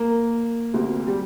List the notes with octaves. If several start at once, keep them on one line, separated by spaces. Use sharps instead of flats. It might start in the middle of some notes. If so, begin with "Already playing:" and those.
Already playing: A#3
D2 C3
G3